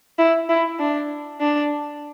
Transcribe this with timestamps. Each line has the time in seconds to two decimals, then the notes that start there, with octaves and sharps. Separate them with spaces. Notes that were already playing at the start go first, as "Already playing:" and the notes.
0.19 E4
0.49 E4
0.79 D4
1.41 D4